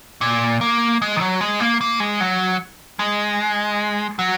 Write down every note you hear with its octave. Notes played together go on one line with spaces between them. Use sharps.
A#2
A#3
G#3
D#3
F#3
G#3
A#3
A#3
G#3
F#3
G#3
F#3